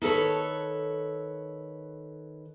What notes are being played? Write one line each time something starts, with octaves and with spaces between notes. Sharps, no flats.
D#3 A4 B4 C#5